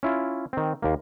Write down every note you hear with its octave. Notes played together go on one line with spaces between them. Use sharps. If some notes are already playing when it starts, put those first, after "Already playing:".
C#4 E4 F4
D#3 C4
D#2 A#3